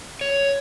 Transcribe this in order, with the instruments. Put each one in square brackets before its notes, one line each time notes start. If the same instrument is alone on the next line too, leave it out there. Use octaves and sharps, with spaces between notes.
[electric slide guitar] C#5